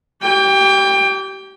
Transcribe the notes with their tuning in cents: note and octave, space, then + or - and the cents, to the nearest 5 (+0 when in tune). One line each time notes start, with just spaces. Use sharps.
G4 -30 G5 +25